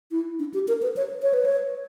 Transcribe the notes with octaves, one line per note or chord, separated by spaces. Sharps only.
E4
D4
G4
A#4
B4
C#5
C#5
B4
C#5